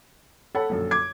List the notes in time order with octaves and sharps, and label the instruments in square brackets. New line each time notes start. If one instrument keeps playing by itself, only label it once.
[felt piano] A4 [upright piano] C#5 F#5 B5
[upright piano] A#1 F#2 D3
[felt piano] D6 G#6